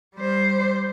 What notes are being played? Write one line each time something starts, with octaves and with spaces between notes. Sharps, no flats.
G3 C5